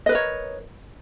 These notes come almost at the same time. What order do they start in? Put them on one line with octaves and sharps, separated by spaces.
D#5 B4 A#4 C#5